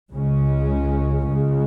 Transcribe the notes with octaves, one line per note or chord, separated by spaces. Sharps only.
C#2 C#3 G#3 C#4
C#2 C#3 G#3